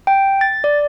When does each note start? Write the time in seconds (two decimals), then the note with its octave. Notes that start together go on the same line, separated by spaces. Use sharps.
0.07 G5
0.41 A6
0.64 D5